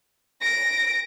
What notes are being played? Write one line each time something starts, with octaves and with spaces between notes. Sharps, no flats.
A#6 D7